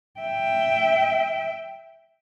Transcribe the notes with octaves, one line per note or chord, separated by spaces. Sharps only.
E5 G5